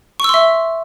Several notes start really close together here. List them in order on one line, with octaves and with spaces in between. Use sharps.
C#6 E6 C6 E5